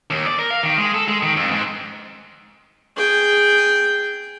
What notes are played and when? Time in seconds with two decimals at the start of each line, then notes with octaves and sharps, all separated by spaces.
0.10 D#2
0.26 D5
0.39 A#4
0.51 F5
0.63 D#3
0.77 G#3
0.94 A4
1.08 G#3
1.23 D#3
1.36 F2
1.51 G#2
2.97 G#4 G5